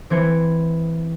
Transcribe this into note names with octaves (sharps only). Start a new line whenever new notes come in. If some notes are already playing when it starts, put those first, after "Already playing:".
E3 C4 C5 G#6 C#7